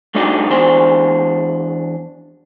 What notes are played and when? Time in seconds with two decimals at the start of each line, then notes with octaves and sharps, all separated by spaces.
0.15 G2 A3 D4 D#4 F#4 G4
0.50 E2 D4 C5